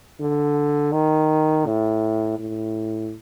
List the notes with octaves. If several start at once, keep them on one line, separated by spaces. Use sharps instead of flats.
D3
D#3
A2
A2